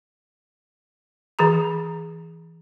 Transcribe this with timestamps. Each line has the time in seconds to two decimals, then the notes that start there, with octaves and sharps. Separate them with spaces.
1.39 E3 G#4 A#5